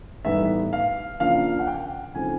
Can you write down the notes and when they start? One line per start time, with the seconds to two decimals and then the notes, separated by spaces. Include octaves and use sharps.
0.24 A2 E3 G3 B3 D#4 E5
0.73 F5
1.20 C#3 F3 A#3 D4 F5
1.59 F#5
1.67 G5
2.15 C#3 F3 A3 C4 D#4 G#5